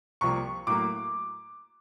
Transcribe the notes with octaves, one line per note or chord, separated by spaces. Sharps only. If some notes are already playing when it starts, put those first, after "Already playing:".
C2 C3 F3 A#3 C#6
A2 F#3 A#3 D6